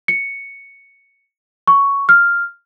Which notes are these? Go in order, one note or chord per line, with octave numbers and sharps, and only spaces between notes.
C#7
C#6
F6